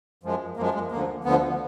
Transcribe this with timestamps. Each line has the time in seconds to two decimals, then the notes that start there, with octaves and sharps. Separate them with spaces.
0.23 F#2 F3 G#3
0.57 F#2 F3 G#3 A#3
0.74 G#3
0.92 D2 D3 F3 A#3
1.24 D2 D3 F3 B3